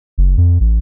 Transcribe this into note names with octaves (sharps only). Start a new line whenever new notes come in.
F#1
F2
A1